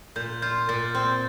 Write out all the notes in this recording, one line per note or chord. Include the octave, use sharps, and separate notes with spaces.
A#2 G6
F4 G6
A#2 A6
C4